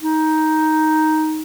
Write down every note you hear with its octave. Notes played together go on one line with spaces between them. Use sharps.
D#4